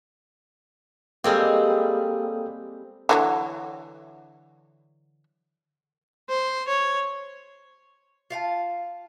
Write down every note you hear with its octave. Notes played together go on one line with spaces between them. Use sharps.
G3 G#3 A#3 C4 A4 D#6
D3 E3 F#3
C5
C#5
F4 F5 F#5 A5